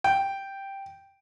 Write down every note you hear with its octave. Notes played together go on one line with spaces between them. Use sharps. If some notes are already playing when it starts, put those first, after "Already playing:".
G5